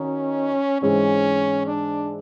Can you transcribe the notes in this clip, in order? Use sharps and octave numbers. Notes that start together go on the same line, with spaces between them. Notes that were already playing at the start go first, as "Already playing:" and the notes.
Already playing: D#3 C#4 D#4 F#4
G#2 E3 G#3 C4 C#4
D4